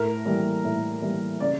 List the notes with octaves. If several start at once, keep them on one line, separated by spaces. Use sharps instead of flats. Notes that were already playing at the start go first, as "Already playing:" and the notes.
Already playing: A2 A#4
E3 G3 A#3
A2
E3 G3 A#3
C#3 D5